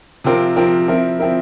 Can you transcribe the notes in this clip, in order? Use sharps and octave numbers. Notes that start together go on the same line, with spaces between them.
C3 F3 C4 F4 A#4
C3 F3 C4 F4 A#4
F3 C4 E4 A#4
F3 C4 E4 A#4